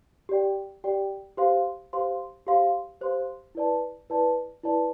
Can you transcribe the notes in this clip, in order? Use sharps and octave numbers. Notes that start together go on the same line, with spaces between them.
G4 D5 G5
G4 D5 G5
G4 C5 F5 C6
G4 C5 F5 C6
G4 C5 F5 C6
G4 C5 F5 C6
E4 B4 D5 A5
E4 B4 D5 A5
E4 B4 D5 A5